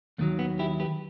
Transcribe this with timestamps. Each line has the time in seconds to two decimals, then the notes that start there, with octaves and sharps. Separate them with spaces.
0.18 D#2 D#3 F#3 A3
0.39 B3
0.59 E4 G4
0.80 G4 B4